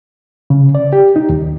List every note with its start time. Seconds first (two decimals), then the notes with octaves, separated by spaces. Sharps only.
0.50 C#3
0.75 D5
0.93 G4
1.16 D#4
1.30 D#2